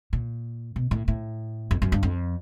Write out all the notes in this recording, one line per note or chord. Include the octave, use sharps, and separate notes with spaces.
A#2
B2
A2
A2
F2
F#2
G2
F2